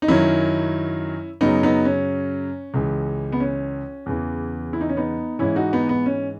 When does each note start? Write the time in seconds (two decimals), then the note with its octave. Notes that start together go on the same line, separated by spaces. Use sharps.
0.02 D#4
0.08 F#2 D#3 F#3 C#4 E4
1.41 F#2 C#3 F#3 B3 D#4
1.63 B3 D#4
1.85 C#4
2.74 C#2 C#3 E3
3.32 B3
3.40 C#4
4.06 E2 C#3 E3
4.73 E4
4.81 D#4
4.89 C#4
4.97 B3 D#4
5.39 G#2 E3 C#4 E4
5.56 D#4 F#4
5.73 B3 D#4
5.89 B3
6.06 C#4